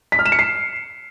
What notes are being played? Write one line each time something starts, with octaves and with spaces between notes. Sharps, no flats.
B6
F6
E7
C#7
C7